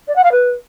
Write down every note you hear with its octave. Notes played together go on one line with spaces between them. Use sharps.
D5
F#5
F5
B4